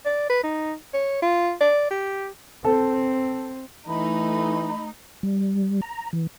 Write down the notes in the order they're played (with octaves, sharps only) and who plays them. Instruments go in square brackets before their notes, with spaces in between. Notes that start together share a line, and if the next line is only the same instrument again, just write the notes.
[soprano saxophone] D5
B4
D#4
C#5
F4
D5
G4
[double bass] C4 [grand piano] A4
[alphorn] E3 [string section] A3 D#4 [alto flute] B5
[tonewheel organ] G3
A#5
E3